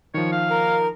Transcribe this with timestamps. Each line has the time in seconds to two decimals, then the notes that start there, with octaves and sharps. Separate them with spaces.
0.14 D#3 F3 C#5
0.32 F5
0.50 A#4